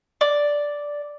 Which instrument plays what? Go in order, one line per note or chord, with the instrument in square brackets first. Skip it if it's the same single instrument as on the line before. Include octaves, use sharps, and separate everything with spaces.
[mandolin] D5